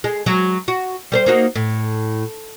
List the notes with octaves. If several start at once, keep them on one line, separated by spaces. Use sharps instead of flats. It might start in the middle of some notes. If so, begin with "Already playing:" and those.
G#3
F#3 G#3
F#4
G3 A#4 C5
A#3 D#4 F#4
A2